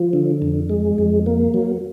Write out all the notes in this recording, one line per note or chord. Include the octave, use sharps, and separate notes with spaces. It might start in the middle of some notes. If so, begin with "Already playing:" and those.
Already playing: F3
D3
F2
G#3
F2
A#3
F#3